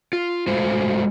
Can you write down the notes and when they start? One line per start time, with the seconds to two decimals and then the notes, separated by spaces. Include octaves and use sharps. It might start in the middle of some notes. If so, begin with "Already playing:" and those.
0.13 F4
0.47 G#3 A3 F4 F#4 C5